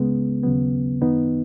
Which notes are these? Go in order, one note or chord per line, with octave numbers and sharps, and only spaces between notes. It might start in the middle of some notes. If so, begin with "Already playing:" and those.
Already playing: C#2 C#3 G#3 B3
D#2 C#3 F#3 B3
F#2 D#3 B3 D#4